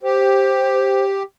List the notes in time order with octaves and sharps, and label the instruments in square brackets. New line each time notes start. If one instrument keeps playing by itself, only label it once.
[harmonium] G4 [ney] C5